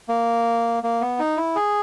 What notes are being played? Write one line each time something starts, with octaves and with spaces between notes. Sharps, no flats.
A#3
A#3
B3
D#4
E4
G#4